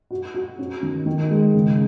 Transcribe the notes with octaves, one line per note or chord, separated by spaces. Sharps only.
F#4
F#4
C#4
D#3
D#3
G#3
C#3